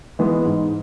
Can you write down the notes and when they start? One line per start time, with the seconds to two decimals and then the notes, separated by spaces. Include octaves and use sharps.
0.19 E3 G#3 B3
0.45 G#2